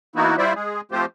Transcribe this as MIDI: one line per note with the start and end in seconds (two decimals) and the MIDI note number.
0.16 0.36 52
0.16 0.36 58
0.16 0.36 59
0.16 0.36 63
0.16 0.36 64
0.16 0.36 66
0.38 0.53 55
0.38 0.53 64
0.38 0.53 65
0.38 0.53 72
0.38 0.53 74
0.38 0.53 76
0.55 0.81 56
0.55 0.81 68
0.92 1.05 53
0.92 1.05 57
0.92 1.05 60
0.92 1.05 65
0.92 1.05 67
0.92 1.05 72